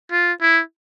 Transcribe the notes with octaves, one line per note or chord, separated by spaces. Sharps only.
F4
E4